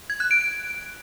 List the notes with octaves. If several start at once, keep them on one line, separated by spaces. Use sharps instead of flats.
G#6
F#6
D7
D7